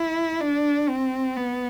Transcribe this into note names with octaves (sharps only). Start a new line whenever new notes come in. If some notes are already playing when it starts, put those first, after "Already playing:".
Already playing: E4
D4
C4
B3